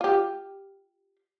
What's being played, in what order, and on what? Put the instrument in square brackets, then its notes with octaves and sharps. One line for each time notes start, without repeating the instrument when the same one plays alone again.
[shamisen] F4 G4